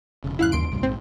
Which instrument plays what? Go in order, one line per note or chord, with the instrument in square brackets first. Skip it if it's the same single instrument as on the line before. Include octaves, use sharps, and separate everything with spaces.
[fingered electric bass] E1 C#3
[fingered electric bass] E2 G2 C#3 [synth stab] E4 F5 F#6
[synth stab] D#2 C6 D7
[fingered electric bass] C2 G2 A#2
[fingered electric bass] A#1 G#2 [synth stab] C4